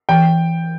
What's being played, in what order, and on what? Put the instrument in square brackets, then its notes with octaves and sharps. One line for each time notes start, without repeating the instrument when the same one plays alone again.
[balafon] E3 [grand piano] G5